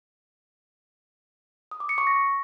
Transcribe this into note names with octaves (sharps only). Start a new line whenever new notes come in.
D#6
D6
C#7
C#6
A#6